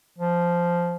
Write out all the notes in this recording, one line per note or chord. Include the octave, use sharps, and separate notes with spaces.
F3